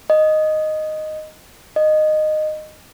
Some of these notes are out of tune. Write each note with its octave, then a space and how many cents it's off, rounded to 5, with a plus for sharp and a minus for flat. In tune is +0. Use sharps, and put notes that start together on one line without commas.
D#5 -5
D#5 -15